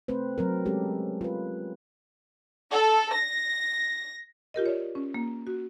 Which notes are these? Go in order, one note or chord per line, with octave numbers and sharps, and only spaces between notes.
A3 C4 B4 C5
F#3 C4 A#4
G#3 C#4 G4 A4
F4 B4
A4
A#6
F4 G4 A#4 D#5
C#5 D5
C#4
A#3
F#4